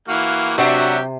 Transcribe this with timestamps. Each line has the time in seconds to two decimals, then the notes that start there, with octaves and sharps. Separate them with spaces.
0.08 E3 A#3 F#4 F5
0.58 C3 F#3 B3 D4 F#4 G4 E5 C#6